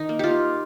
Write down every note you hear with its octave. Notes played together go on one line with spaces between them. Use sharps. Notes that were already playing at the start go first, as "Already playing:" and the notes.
Already playing: D#3 D#4
A#3
F4 G4